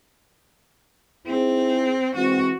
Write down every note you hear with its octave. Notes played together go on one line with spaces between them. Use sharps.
C4 D#4 E4 G#4
E3 G#3 C4 F#4